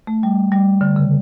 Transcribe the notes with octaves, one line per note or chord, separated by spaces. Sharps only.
A3
G3
G3
D3
C#3